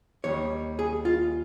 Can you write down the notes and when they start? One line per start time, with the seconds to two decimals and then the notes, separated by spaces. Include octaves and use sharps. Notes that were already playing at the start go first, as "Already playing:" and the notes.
0.24 D#2 D#3 G3 C#5
0.79 G#4
1.05 F4